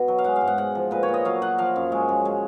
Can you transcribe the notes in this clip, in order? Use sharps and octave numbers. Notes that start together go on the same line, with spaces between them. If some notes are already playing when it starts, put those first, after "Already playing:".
Already playing: B2
F#3
F5
G#3 F#5
F5
G#2
F#5
G#2 F#5
F3
A#2 B4
C#5
A#2
D#5
F#3 F5
F#3 F#5
F3 F5
F#2
G#3
C#3
G#3